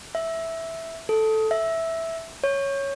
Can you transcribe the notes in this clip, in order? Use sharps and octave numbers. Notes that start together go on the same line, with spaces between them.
E5
A4
E5
C#5